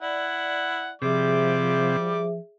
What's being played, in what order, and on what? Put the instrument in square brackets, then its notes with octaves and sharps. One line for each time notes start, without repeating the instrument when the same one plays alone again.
[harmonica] E4 F#5 [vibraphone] D5
[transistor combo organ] C3 [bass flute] F3 [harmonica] G3 D6 [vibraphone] G#4 E5